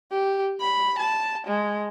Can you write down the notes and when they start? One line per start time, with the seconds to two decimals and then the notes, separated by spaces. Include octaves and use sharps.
0.12 G4
0.61 B5
0.99 A5
1.47 G#3